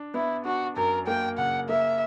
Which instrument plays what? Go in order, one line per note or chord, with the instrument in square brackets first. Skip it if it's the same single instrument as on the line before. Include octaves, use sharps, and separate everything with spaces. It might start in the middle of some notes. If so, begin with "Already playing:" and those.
Already playing: [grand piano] D4
[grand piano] B3 [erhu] E4
[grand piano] D4 [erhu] F#4
[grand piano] F#2 [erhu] A#4
[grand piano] A#3 [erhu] G5
[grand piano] C#3 [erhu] F#5
[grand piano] A#3 [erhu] E5